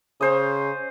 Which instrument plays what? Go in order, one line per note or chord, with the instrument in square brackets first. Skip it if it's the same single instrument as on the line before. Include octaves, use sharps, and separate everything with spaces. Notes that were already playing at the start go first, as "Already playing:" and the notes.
[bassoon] C#3 [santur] C#4 C5 D#5